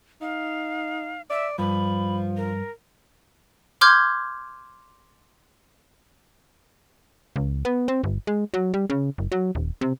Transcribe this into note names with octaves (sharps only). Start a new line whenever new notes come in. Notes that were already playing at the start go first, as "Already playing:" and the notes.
D#4 F5
D5 E5
G2 F3 B5
A#4
C6 D6 F6 G6 G#6
C#2
B3
C4
G1
G#3
F#3
G3
C#3
F#1
F#3
D#1
C3